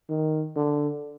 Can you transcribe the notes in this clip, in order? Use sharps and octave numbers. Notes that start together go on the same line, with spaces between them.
D#3
D3